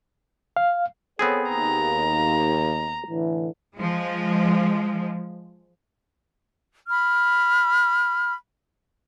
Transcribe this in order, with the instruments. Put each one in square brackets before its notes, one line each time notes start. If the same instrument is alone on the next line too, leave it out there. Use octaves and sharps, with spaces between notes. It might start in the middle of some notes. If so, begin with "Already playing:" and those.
[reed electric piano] F5
[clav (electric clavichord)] B3 C4 G#4 [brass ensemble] A4 C#5
[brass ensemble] D#2 [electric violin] A#5
[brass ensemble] A2 D3 E3
[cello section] F3 G#3
[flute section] B5 F6